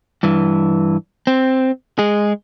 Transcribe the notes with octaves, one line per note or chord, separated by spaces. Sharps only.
G2 E3
C4
G#3 G#4